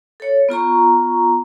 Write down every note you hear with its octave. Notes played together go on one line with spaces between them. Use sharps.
A4 C#5
B3 F4 A#5 C#6